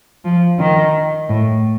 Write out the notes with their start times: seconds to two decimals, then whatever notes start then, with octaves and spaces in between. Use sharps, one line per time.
0.25 F3
0.59 D#3
1.29 A2